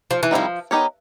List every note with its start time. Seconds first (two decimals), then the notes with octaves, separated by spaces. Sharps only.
0.11 F3
0.23 E3
0.31 D#3 F3 G3 C4 E4
0.71 B3 D#4 G4 A#4 C#5